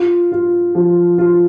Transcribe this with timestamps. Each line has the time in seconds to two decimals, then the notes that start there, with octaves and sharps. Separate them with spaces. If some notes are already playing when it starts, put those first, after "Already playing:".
Already playing: F4
0.32 F4
0.75 F3
1.18 F4